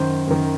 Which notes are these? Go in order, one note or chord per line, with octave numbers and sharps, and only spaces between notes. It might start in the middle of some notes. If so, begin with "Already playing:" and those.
Already playing: F#2 D#3 C5
F#2 D#3